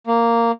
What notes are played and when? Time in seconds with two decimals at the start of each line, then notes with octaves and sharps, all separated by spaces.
0.07 A#3